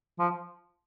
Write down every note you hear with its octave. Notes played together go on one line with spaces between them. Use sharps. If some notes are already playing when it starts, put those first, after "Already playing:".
F3